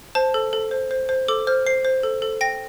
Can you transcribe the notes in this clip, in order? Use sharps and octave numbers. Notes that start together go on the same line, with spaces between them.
C5 A5
A4
A4
C5
C5
C5
A4 D6
C5 F6
C5 C7
C5
A4
A4
G5 A#6